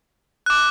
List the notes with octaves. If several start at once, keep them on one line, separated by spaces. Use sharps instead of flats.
D6 F#6